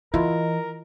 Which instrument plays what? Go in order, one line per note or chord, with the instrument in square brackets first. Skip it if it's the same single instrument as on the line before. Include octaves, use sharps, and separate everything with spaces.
[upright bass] E3 [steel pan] E4 F4 [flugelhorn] A#4 [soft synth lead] D#5